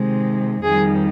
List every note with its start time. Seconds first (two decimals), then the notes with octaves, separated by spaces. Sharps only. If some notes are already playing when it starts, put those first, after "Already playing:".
Already playing: C3 D#3 G#3
0.63 F2 D#3 G3 G#4